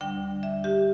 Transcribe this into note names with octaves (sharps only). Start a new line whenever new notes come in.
D2 D3 G3 D4 G5
E5
G4